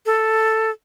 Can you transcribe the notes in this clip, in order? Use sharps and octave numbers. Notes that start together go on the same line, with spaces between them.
A4